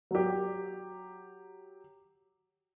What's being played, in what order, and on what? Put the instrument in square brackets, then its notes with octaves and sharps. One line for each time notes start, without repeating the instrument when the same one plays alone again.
[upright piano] F#3 G4